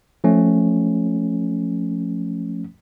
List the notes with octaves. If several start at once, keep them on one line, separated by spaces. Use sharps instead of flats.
F3 A3 C#4